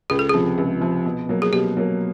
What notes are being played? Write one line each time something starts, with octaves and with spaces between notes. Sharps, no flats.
C#2 G#4
A4
C3 F3 G#4
C#2
C3 F3
B2
F#3 A#3
G#4
B2 G4
F#3 A#3